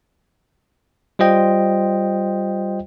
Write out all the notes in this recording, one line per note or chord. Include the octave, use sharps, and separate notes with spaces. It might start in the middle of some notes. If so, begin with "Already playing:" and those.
G3 F4 C5 D#5 G5